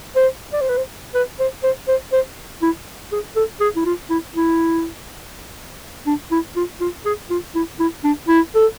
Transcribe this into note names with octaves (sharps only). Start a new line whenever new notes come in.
C5
D5
C5
B4
C5
B4
C5
C5
C5
C5
E4
G#4
A4
G#4
E4
F4
E4
E4
D4
E4
F4
F4
G#4
F4
E4
E4
D4
E4
A4